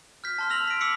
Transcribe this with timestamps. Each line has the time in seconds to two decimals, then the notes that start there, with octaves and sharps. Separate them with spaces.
0.24 F6 G6 B6
0.38 A5 C6 F6
0.50 E6 A#6 F7 F#7
0.68 B6 D7
0.81 D6 E6 B6 C#7